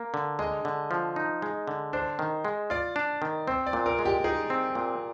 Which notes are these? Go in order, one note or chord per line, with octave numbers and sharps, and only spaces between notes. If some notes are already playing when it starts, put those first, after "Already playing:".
Already playing: A#3
D3
G#3 D#5
D3
F3
D#4
G#3
D3
D4 C5
D#3
G#3
F4 D5
D4
D#3
C4 C5
D5
A#2
A#4
G#3
G4
D#4 G#4
C4
A#2